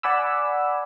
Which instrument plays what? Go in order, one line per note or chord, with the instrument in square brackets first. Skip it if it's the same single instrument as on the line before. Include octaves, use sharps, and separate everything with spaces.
[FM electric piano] D5 F#5 G#5 B5 D6 E6